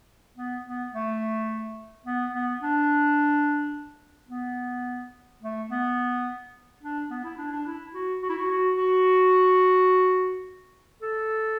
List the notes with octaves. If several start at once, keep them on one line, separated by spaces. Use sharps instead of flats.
B3
B3
A3
B3
B3
D4
B3
A3
B3
D4
B3
E4
D4
D4
E4
F#4
F#4
E4
F#4
F#4
F#4
A4